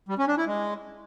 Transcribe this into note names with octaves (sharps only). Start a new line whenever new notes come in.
G3
C#4
D4
E4
G#3